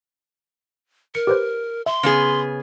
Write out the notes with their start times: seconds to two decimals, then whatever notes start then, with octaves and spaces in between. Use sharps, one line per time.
1.15 A#4 C#7
1.27 G4 B4 C5
1.86 E5 C6
2.03 C#3 B3 G#4